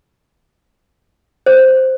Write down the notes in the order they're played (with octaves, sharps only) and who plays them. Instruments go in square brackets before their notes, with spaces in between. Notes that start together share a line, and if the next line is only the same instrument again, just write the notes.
[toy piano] C5